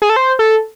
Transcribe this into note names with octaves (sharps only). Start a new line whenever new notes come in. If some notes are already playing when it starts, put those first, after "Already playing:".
G#4
A4
C5
A4